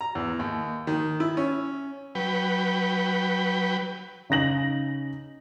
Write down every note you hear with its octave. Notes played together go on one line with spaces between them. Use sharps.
A#5
E2
D#2
D#3
E4
C#4
F#3 B4 G5
C#3 D#4 A#6 F#7